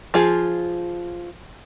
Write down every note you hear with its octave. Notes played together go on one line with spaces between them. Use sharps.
F3 F4 G#4